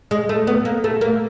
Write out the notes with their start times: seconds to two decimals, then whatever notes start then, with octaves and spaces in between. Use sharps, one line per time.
0.11 G#3
0.29 A3
0.47 B3
0.65 A#3
0.84 A3
1.01 A#3